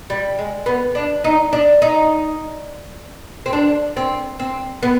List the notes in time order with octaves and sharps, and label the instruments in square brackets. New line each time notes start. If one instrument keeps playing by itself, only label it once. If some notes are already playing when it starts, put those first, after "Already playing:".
[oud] G3
G#3
B3
D4
D#4
D4
D#4
C4
D4
C4
C4
B3